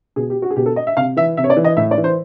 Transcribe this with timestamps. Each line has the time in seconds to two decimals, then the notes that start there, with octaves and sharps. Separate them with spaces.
0.16 B2 G#4
0.30 G4
0.42 F#4
0.51 G#4
0.56 B2 G4
0.66 A4
0.76 D#5
0.87 E5
0.97 C3 F5
1.16 E3 E5
1.37 C3 E5
1.44 C#5
1.50 D5
1.57 E3
1.64 D#5
1.77 A2 E5
1.91 D5
1.98 E3
2.04 C5